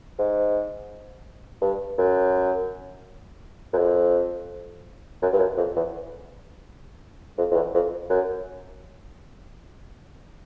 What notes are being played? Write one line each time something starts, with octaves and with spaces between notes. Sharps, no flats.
G#2
G2
F#2
F#2
F2
F#2
G2
F#2
F2
E2
F2
F2
E2
F2
F#2